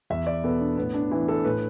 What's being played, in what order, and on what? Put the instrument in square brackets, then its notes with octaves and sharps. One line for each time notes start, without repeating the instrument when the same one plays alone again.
[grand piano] E2 E5
D5
B2 B3 A4
D4
A2 B3
D4
E3 B3 E4
A4
A2 B4